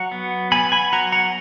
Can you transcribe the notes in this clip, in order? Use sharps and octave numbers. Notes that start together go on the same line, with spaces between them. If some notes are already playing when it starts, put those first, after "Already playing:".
Already playing: F#3 F#5 A#5
B3
B3 G#5 B5
G#5 B5
F#3 F#5 A#5
F#5 A#5